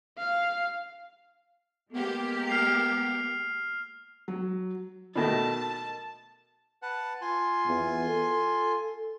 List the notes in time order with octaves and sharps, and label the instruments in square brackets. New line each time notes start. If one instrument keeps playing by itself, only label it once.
[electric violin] F5
[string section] G#3 A#3 G4 [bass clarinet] B3
[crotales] F6 C7 F7
[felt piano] F#3
[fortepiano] B2 D#3 A3 [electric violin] A5
[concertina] B4 F#5 A5
F4 G#5 C6
[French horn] E2
A4